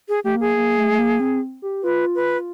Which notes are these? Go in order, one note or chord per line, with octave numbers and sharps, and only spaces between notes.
G#4
A3 G4
A#3 G#4
A#3
A3
A3
A#3
C4
G4
F4 B4
B4